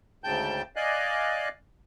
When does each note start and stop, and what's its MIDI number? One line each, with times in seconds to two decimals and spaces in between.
0.24 0.62 38
0.24 0.62 44
0.24 0.62 49
0.24 0.62 79
0.24 0.62 81
0.24 0.62 91
0.76 1.49 74
0.76 1.49 75
0.76 1.49 77
0.76 1.49 80
0.76 1.49 90